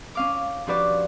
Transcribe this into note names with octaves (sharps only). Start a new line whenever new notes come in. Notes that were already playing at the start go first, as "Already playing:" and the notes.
C#4 F5 D6
F3 D4 F#4 G4 B4 D5